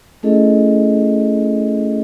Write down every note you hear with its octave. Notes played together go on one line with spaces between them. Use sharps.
A3 C#4 E4 G#4 A4 D#5